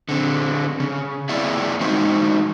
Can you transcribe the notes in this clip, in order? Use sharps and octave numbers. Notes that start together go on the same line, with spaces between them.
D3 C4
C#3
A#3 C4 E4 G#4 D5 E5
E3 G#3 D#4 F#4 C5